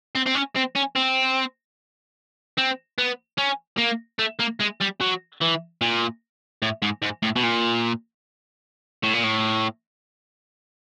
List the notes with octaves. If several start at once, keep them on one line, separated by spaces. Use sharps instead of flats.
C4
C4
C#4
C4
C#4
C4
C4
B3
C#4
A#3
A3
A#3
G#3
G3
F#3
E3
A#2
A2
G#2
G#2
A2
B2
A#2
A2
A#2
A2